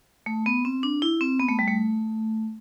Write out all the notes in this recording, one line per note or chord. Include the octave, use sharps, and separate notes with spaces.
A3
B3
C4
D4
E4
C4
B3
A3
G3
A3